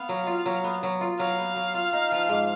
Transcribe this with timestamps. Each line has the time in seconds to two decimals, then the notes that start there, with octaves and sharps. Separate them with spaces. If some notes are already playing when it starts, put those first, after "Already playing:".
Already playing: B3 F5
0.09 F#3
0.27 F4
0.46 F#3
0.64 B3
0.83 F#3
1.01 F4
1.19 F#3 F5
1.38 B3
1.56 F#3
1.74 F4
1.93 D#4
2.12 F3
2.29 G#2